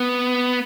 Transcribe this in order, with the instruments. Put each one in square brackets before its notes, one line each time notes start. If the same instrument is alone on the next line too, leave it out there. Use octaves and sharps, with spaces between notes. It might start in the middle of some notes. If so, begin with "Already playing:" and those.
Already playing: [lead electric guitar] B3